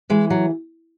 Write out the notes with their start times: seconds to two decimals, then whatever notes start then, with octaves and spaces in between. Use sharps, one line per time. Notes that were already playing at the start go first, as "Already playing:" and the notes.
0.10 E3 G#3
0.30 F#3